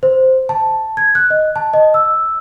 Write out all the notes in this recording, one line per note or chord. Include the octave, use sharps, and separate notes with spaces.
C5
A5
G#6
F#6
D#5
A5
D#5
E6